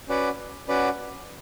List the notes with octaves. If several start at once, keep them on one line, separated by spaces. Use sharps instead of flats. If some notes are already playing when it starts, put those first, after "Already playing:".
C#4 F#4 B4 D5 F#5
C#4 F#4 B4 D5 F#5